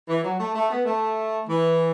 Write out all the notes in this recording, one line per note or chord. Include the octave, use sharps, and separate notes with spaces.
E3
F#3
A3
A3
B3
A3
E3